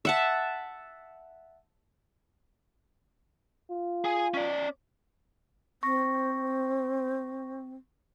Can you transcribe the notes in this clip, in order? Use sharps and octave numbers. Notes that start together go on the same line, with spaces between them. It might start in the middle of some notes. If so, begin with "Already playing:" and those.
E5 F#5 A5
F4
G#4 G#5
C#4 D5
C4 C#6 A#6